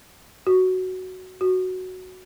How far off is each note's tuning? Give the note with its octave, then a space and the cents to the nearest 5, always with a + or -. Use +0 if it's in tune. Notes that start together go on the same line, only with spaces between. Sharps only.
F#4 +5
F#4 +0